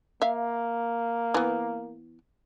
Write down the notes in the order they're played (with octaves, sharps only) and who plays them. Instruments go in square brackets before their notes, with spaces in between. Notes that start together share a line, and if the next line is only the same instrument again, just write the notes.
[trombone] A#3 [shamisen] E5 F5
[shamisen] E3 B3